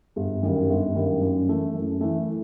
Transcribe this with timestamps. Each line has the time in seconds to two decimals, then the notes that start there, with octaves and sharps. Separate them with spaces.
0.16 G1
0.43 F#2 D#3 G3
0.69 G1
0.95 F#2 D#3 G3
1.22 F#2
1.48 E3 A3
1.74 F#2
2.01 E3 A3